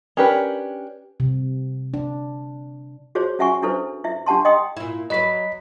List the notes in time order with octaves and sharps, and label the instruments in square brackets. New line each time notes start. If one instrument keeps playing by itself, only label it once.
[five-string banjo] C#4 D4 G4 A#4 B4
[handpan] C3
D4
[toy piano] F#4 G#4 C5 C#5
C#4 F#4 E5 F#5 G#5 C#6
D4 E4 A4 B4 C5
E4 E5
D4 G4 F#5 A5 C6
D#5 F#5 G5 C6 D#6
[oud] A#2 E4
[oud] F#3 B4 [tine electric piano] D#5 B5 B6